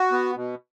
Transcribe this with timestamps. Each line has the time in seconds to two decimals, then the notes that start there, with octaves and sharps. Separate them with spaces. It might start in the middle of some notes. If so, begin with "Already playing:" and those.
Already playing: F#4
0.12 B3
0.35 B2